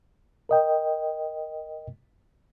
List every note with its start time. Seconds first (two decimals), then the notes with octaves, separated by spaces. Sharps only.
0.49 A#4 D#5 G5